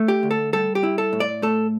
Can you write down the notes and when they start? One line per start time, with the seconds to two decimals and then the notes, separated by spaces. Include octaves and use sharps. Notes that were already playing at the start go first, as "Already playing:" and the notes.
Already playing: A3
0.08 G4
0.23 D2
0.31 A4
0.53 G3 A4
0.75 G4
0.83 E4
0.98 A4
1.13 A2
1.20 D5
1.42 A3 A4